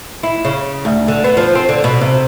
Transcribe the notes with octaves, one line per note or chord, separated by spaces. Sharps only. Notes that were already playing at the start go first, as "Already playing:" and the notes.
E4
C#3
D2
D3
B3
F3
C4
D3
B2
C3